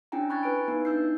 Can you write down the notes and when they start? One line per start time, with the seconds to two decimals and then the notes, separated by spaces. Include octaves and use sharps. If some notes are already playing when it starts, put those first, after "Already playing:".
0.12 C#4 D4 E4 G5 G#5 A#5
0.29 B5 C#6 F#6 G#6 A6
0.43 E4 B4 G#5 D7
0.68 B3 D#4 E4 B4
0.85 D4 D#4 E6 G6 C7